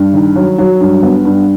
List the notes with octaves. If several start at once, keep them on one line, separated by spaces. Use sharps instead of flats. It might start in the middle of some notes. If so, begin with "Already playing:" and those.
Already playing: G2
D#3
F#3
F#3
G2
B3
G2